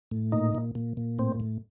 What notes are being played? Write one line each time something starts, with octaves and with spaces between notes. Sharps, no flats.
A2
A#2 D#4
A#2
A#2
A#2
A2 C4
A2